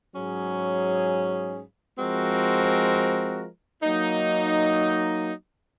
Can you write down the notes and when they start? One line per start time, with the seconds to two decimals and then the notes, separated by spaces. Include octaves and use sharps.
0.14 G#2 F#3 C#4 G#4
1.99 F3 G#3 C4 F#4 A#4
3.83 F#3 A#3 D#4